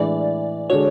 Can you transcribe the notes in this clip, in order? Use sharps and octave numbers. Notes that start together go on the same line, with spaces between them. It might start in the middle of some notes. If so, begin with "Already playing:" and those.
Already playing: A2 E3 G#3 D4 D5
D3 G#3 D4 F#4 C#5